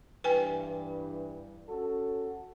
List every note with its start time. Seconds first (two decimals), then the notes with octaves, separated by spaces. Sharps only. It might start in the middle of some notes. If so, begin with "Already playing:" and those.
0.24 G2 E3 B4 G5 G#5
1.69 C#4 F#4 A4